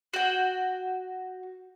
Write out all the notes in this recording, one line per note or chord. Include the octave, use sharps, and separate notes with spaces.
F#4 G5